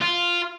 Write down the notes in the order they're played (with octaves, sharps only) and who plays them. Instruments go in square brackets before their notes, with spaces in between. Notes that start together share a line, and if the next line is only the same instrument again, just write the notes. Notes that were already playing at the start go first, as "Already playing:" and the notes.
[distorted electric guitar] F4